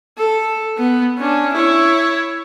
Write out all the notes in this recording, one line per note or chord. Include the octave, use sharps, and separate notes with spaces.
A4
B3
C#4 D4
E4 C#5